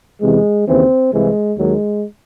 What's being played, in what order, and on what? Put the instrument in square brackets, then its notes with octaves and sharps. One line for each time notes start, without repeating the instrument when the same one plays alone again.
[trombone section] E2 C3 E3 G#3
D#2 C#3 E3 C4
C2 C3 E3 G#3
D#2 D#3 F#3 G#3